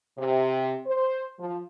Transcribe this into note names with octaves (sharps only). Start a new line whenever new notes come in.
C3
C5
F3